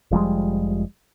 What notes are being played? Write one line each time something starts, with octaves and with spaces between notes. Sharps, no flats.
F1 F3 G3 G#3